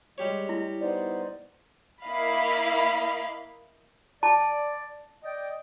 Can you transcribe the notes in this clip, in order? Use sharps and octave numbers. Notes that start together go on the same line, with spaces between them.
G3 G#3 G4 C#5
E4
B3 D#4 C5 D5
A#3 E4 D#5 F5 B5
D5 A5
D5 D#5 G5